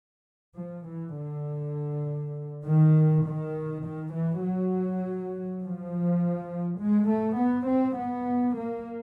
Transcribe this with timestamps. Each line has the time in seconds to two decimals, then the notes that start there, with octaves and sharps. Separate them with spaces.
0.57 F3
0.88 E3
1.17 D3
2.65 D#3
3.25 D#3
3.84 D#3
4.13 E3
4.43 F#3
5.62 F3
6.80 G#3
7.09 A3
7.39 B3
7.69 C4
7.99 B3
8.58 A#3